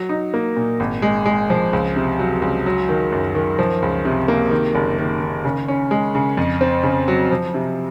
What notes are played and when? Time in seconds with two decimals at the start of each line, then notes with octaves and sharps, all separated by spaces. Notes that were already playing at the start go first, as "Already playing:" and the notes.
Already playing: F#3
0.09 D#4
0.34 A#3
0.57 A#2
0.80 G#1
1.02 G#3
1.26 G#3
1.50 F3
1.73 C#2
1.96 C3
2.19 F#3
2.42 C#2
2.66 F#3
2.89 D#3
3.12 F#2
3.35 D#3
3.59 F3
3.82 C#2
4.05 C3
4.28 A#3
4.51 D#3
4.75 F#1
4.99 D#3
5.21 D#3
5.45 C#3
5.68 C#4
5.91 G#3
6.15 C#3
6.37 F2
6.61 C4
6.83 C#3
7.08 F#3
7.31 F3
7.54 C3